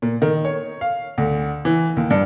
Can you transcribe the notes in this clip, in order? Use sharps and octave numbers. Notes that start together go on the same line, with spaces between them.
A#2
D#3
C#5
F5
D2
E3
D#2
G2